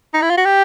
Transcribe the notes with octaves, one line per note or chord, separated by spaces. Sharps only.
D#4
E4
F4
F#4
G4